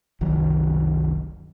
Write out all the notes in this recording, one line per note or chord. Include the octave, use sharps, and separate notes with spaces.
F#1 C2 D#3 F#3